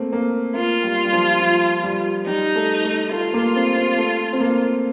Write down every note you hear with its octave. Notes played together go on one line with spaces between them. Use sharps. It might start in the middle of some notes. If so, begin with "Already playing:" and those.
Already playing: A3 A#3 C4
A#3
A#3 F4
G3
G3
F3
F3
G3
G3 D#4
A3
A3
A3 F4
A#3
C4
C4
A3
C4
A#3